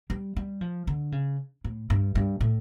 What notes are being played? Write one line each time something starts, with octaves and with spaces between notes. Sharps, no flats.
G3
G3
F3
D3
C#3
A2
G2
G2
A2